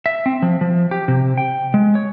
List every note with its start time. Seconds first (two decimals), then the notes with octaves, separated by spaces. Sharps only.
0.06 E5
0.26 C4
0.42 F3
0.61 F3
0.91 G4
1.08 C3
1.38 G5
1.74 G#3
1.95 C#5